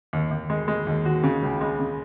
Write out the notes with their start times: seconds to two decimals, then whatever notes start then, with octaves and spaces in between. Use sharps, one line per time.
0.13 D#2
0.31 D#2
0.50 G#3
0.68 G#3
0.87 D#2
1.05 F#4
1.23 C#3
1.42 C#2
1.61 G#3
1.80 C#3